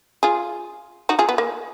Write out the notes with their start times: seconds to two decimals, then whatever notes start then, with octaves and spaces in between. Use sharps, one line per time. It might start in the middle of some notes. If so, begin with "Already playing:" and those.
0.23 F4 G#4
1.09 D#4 F#4
1.19 F4 G#4
1.29 B3
1.38 A#3